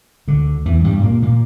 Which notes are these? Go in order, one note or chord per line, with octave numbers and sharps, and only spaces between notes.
D2 D3
E2 E3
G2 G3
A#2 A#3
A#2 A#3